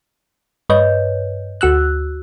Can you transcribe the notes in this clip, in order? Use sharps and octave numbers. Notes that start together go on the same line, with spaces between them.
G2 B4 C#5 D#5 G6
D2 F#4 E6 F#6